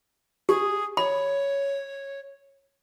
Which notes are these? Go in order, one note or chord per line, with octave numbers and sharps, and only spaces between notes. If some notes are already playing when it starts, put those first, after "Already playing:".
G4 G#4
C#5 B5